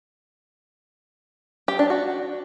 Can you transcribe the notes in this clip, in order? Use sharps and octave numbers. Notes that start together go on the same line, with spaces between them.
G4
D4
F#4